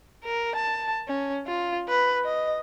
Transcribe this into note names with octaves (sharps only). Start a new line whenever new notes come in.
A#4
A5
C#4
F4
B4
D#5